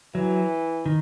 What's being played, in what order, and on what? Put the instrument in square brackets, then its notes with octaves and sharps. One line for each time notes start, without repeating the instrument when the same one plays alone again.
[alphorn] E3 [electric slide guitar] F#3
[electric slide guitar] D#3